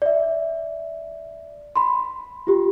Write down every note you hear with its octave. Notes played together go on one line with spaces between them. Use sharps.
D5 E5
B5 C6
F4 G4